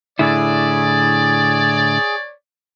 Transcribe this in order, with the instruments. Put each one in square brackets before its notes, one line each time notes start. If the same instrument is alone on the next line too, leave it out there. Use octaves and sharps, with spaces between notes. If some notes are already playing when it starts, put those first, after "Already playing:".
[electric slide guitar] A2 D3 E4 [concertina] G#4 [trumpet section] C#5 D5